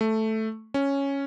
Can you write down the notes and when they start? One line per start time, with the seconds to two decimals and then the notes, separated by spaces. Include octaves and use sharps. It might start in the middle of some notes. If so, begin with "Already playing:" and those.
0.01 A3
0.74 C#4